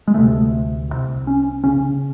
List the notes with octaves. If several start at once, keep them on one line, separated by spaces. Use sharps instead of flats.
G#3
D2 C3 A3
C2 C3
C#4
C#3 C#4